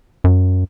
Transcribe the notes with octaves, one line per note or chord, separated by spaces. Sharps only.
F#2